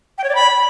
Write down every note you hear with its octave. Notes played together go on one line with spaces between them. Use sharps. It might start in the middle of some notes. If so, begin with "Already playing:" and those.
G5
C#5
D5
B5